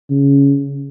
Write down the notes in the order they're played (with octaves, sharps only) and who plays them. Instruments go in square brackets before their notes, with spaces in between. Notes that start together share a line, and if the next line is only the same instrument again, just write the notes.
[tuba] C#3